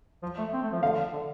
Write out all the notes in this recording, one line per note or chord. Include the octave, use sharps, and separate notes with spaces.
F3
A3
C4
A3
F3
D3 F5
D3